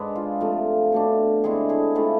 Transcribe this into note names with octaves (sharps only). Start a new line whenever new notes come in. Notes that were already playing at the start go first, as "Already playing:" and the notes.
Already playing: G#2 G#3 D4 B4
F4
C3 F3 A3 F4
B2 A3 D4
D3 G#3 C4 E4 G#4
E4 G#4
D3 A3 C4 E4 F4